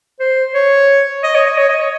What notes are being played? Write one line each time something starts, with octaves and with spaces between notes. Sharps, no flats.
C5
C#5
D#5
C#5
D#5
C#5
D#5
C#5